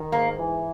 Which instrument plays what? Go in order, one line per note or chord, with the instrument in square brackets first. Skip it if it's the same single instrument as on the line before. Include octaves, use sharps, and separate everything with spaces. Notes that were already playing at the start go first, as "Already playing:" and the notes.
Already playing: [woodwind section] D#3
[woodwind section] G#2 [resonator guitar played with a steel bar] A#3
[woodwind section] E3